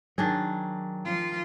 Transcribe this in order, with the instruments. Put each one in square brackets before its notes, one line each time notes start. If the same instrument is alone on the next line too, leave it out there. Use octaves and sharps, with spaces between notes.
[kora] D#3 D4 G#4 [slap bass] F#3
[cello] F3 F4